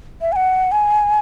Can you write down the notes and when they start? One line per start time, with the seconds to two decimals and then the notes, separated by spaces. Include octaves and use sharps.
0.21 E5
0.32 G#5
0.36 F#5
0.72 G#5